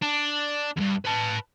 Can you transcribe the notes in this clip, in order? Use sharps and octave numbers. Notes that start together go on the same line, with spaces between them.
D4
E2 G2
B4 A5